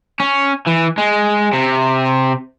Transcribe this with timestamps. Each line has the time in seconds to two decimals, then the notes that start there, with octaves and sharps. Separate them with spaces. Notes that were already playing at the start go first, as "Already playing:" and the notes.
0.20 C#4
0.67 E3
0.98 G#3
1.53 C3